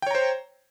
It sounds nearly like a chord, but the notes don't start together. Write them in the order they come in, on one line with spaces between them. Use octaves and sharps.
G5 C#5 A#5 C5